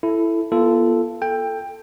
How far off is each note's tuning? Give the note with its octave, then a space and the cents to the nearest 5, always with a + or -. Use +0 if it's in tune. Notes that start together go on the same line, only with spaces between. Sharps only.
E4 +10 A4 +0
B3 -40 F4 -20 A4 +0
A4 +5 G5 +15